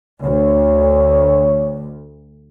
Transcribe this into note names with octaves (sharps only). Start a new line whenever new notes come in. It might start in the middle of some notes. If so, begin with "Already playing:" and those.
D2 C#5